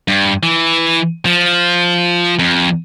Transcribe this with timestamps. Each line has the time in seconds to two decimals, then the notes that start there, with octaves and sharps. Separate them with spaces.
0.08 G2
0.43 E3
1.26 F3
2.39 F2